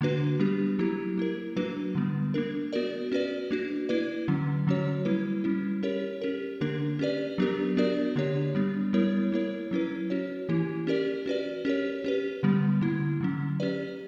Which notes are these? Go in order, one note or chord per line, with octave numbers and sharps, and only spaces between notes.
D3 A#3 D4 F#4 B4
G3 B3 D4 G4
F#3 A#3 E4 G4
A#3 E4 A#4
F#3 A#3 D4 F#4 B4
D3 G3 B3
A#3 D4 A#4
B3 F#4 A#4 D5
C#4 F#4 B4 D5
A#3 D4 F#4
A#3 E4 B4 D5
D3 F#3 C#4
D3 F#3 C#4 F#4 C#5
G3 A#3 E4 B4
G3 C#4 E4
C#4 G4 A#4 C#5
C#4 G4 A#4
D3 A#3 D4 A#4
C#4 G4 B4 D5
F#3 B3 D4 G4 A#4
B3 D4 F#4 A#4 D5
D3 A#3 D4 G4 C#5
G3 B3 D4
G3 B3 E4 A#4 C#5
A#3 E4 A#4 C#5
F#3 C#4 E4 B4
C#4 F#4 C#5
E3 A#3 E4 G4
C#4 G4 A#4 D5
C#4 F#4 B4 D5
C#4 G4 A#4 C#5
C#4 G4 B4
D3 G3 B3
D3 A#3 E4
D3 F#3 C#4
C#4 G4 B4 D5